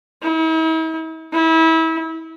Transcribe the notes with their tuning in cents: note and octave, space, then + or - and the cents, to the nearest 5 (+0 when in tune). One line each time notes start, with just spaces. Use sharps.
E4 -45
E4 -30